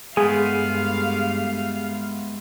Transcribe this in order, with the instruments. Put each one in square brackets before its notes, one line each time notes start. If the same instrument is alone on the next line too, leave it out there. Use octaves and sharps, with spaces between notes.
[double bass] G2 [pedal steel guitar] G#3 A3 B3 [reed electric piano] G#4 [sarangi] F5